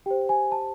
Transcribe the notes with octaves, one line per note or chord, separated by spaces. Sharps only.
G4 C5 G5
G#5
A5